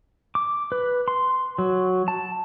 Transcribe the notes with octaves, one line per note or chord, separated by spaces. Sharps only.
D6
B4
C6
F#3
A5